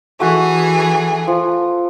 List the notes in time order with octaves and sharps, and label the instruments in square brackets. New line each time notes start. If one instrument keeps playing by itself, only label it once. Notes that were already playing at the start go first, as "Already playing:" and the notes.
[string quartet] E3 G#4 [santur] A3 F#4
[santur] F3